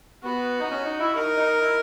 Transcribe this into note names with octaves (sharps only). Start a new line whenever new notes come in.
B3 F#4
D#4
C#4
D#4
E4
D#4 A#4
D#4
E4